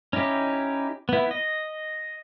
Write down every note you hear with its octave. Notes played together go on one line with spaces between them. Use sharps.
C#4 D#4 E4 G4
B3 E4
D#5